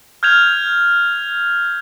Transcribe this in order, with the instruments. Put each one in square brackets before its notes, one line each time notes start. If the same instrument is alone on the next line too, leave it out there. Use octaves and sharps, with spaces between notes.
[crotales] F6 G6 G#6 F7